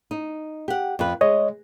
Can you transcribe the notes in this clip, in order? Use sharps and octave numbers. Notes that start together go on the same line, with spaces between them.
D#4
G4 F#5
F2 B4
G#3 C#5 D#5